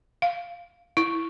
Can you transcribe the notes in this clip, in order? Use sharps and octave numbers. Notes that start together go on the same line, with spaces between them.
F5
E4